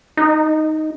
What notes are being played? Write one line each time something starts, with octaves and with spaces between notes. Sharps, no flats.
D#4